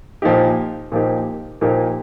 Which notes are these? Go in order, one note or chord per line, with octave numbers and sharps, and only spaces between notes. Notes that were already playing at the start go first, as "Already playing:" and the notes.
A#2 F3 A#3 D#4 G4
A#2 F3 A#3 D#4 G4
A#2 F3 A#3 D#4 G4